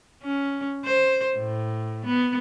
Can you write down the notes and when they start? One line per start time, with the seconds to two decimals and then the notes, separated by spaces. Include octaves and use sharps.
0.23 C#4
0.85 C5
1.37 A2
2.06 B3